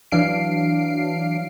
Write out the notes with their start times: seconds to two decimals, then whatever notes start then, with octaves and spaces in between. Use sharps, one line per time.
0.12 E3 F#3 D4 F5 C7 D7